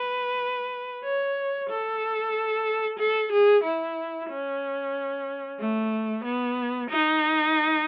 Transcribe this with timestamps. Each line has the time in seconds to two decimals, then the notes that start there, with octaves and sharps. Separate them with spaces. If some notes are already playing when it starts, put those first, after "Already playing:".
Already playing: B4
1.04 C#5
1.70 A4
2.99 A4
3.32 G#4
3.64 E4
4.30 C#4
5.60 A3
6.24 B3
6.90 D#4